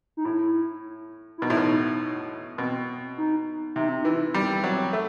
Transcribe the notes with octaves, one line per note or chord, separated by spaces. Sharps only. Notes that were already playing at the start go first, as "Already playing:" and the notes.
D#4
A2 E4
E4
B2 D#4
A2
B2
B2 C4
D#4
C3 D#4
C4
E3 D#4
G3 C4
F#3
A3